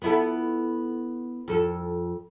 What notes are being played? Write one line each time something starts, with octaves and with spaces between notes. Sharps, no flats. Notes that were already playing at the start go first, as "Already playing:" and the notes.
B3 E4 A4
F2 A4